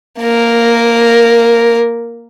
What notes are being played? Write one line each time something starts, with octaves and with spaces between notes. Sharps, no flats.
A#3 A#4